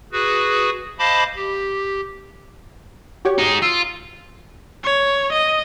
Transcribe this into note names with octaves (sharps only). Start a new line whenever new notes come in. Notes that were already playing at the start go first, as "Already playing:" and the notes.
F#4 G#4 B4
C5 D#5 F5 A5 B5 D6
G4
F#4 G4 C#5
D#4 G#4
F4 E6
C#5
D#5